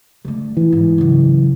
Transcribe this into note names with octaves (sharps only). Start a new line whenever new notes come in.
D3 A3
E3
G#2
C#3 F#3